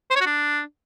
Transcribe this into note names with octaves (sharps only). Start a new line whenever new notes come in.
C5
C#5
F#4
D4